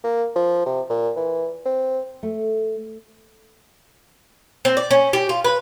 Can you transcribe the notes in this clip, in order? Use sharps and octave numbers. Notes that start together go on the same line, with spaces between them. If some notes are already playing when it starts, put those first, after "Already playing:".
A#3
F3
C3
A#2
E3
C4
A3
C4
D5
C#4
G4
F4
B4